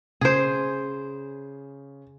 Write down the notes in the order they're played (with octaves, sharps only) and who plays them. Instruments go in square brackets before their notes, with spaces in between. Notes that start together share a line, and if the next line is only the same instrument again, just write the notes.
[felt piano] C#3 [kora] G#4 C5